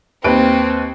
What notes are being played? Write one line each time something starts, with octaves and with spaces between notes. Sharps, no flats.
D#2 C4 B4 D7